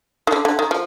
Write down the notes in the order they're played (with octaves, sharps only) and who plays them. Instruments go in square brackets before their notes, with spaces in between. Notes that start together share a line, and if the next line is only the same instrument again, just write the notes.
[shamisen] D#3
D3
D3
D#3
F3